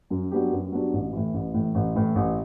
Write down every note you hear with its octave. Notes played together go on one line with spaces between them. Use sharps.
F#2
F#3 B3 D4 G4
F#2
F#3 B3 D4 G4
A1
A2 E3
A1
A2 E3
A1
A2 E3
A1